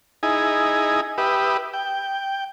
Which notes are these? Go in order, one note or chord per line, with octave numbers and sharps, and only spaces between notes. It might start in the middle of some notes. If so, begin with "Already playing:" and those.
D#4 E4 G#4 G#5
G4 B4 E5 D#6
G5